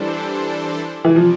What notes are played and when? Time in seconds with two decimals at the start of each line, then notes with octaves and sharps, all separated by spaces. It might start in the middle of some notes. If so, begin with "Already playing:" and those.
Already playing: E3 G3 D4 A4 C5
1.05 C3 E3 G3
1.16 F3